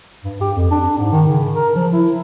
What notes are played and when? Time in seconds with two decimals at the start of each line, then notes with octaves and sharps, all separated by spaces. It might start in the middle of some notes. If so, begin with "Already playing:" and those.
0.24 G2
0.41 G4
0.56 F2
0.71 D4
0.98 G#2
1.12 D#3
1.27 C#3
1.56 A#4
1.76 F3
1.93 E4